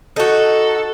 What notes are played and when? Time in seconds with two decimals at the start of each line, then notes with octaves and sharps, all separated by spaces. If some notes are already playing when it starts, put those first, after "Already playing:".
0.16 D#4 F#4 A4